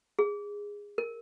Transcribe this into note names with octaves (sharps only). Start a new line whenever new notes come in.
G#4
A#4